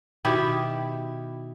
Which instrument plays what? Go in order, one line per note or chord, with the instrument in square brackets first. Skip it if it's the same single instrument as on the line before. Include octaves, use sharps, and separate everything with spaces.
[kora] B2 D#3 E4 G4